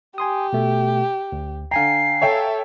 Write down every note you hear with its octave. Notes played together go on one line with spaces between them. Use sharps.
G4 G#5 C6 D#6
B2 A3
D2
D3 F5 G5 G#5 A#5 C7
A4 C#5 E5 G5